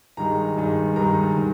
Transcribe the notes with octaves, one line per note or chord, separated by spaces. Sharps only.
G2 D#3 G#3 A#5
G2 D#3 G#3
G2 D#3 G#3 A#5
D#3